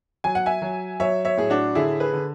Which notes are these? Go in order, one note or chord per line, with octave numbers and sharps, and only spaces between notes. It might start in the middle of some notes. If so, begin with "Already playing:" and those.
F#3 G#5
F#5
E5 G#5
F#3
F#3 C#5 E5
C#5 E5
A2 G#4
D4 F#4
D3 E4 G#4
G#4 B4
D3